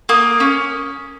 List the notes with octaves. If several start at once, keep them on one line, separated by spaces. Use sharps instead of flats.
A#3 D#6
C#4